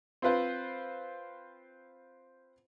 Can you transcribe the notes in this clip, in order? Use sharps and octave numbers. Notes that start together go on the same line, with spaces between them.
C4 F4 B4 C5